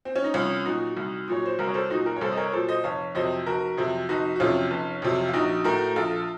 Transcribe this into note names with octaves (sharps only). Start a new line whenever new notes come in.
C4
C#4
D#4
C2 C#4 F4
A#2 F#3 D#4 F#4
C2
A#2 F#3 C#5
C5
C2 F#4 A#4
C#5
A4 C5
A#2 F#3 D#4 F#4
F#4 A#4
C#5
C2 A4 C5
D#5
A#4 C#5
A#2 F#3 A4 C5
C5 D#5
F1 C#5 F5
F2 C3 F#3 C5 D#5
F1 F#4 A#4
F2 C3 F#3
F1 D#4 F#4
F#4
F2 C3 F#3 C#4 F4
F1
F2 C3 F#3
F4
A#1 D#4 F#4
A2 A3 F#4 A#4
A#1 F4 A4